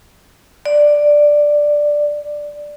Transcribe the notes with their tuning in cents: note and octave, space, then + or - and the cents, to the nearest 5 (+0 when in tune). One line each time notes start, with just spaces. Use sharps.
D5 +5